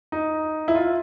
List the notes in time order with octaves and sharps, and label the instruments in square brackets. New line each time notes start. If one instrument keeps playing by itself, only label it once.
[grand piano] D#4
E4
F4